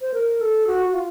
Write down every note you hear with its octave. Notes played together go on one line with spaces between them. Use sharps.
C5
A#4
A4
F#4
F#4
F4